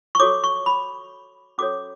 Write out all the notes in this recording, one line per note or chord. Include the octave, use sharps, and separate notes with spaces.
C#6
F#4 A4 C#5 D6
C#6
B5
C#4 F#4 A4 C#5 D6